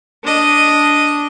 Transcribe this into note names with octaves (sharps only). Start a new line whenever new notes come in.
D4 D#5